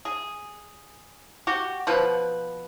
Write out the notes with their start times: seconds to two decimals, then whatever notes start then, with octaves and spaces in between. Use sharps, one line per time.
0.05 G#4
1.47 F#4 G4
1.87 B2 F3 B4